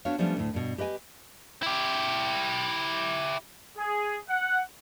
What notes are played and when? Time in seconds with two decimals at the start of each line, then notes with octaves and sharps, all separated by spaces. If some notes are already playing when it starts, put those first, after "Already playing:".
0.05 B3 D4 F#4 C#5 F5
0.18 F3 G3 A3 B3 C#4 D4
0.37 D2 A2
0.54 G2 B2
0.78 G4 B4 D#5 G5 G#5
1.63 E4 G4
3.78 G#4
4.29 F#5